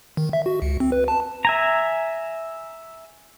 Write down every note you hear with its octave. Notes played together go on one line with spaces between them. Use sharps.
D#3
E5
F#4
C#2
C4
B4
A5
E5 G#5 A#5